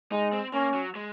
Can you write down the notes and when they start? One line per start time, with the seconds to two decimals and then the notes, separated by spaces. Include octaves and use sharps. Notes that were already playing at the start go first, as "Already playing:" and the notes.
0.12 G#3 D#4
0.33 C4
0.54 A#3 C#4
0.74 F#3
0.95 G#3